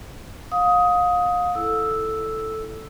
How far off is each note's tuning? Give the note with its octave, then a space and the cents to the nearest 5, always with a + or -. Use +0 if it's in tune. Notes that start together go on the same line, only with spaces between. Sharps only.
F5 +35 D#6 +15
E4 +15 A4 +0 E6 +0